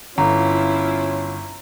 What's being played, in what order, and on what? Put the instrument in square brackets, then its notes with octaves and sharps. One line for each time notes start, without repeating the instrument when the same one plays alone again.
[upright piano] G1 [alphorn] C#4 [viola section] E4 F4 [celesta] A#5